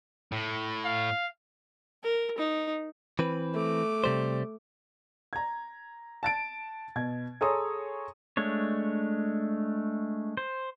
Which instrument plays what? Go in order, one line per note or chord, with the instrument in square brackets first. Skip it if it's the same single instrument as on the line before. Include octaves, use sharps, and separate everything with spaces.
[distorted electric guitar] A2
[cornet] F5
[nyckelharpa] A#4
D#4
[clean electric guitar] E3 C4 B4
[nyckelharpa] A3 D6
[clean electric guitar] C3 G3 C5
[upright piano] A#5 G#6
A5 A6 D7
B2 G#6
G#4 A4 C#5 A#5 C6 D#6
[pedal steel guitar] G#3 A3 D4 C#5
C5